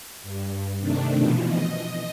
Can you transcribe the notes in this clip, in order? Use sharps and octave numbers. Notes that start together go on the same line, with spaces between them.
G2
C3 D#3 A3 D4
B2 E3 F3
D#5